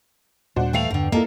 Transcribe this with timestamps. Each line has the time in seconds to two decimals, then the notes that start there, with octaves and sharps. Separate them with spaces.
0.56 D#2 A#2 G3 D4 F#4 C5
0.73 E3 A3 F5 G5 C7 F7
0.91 E2 G2 B2 D3
1.12 A#3 E4 A4 D#5